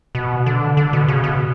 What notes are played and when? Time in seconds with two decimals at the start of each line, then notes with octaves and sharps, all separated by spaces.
0.15 B2
0.46 D3
0.77 D3
0.93 B2
1.08 C#3
1.24 B2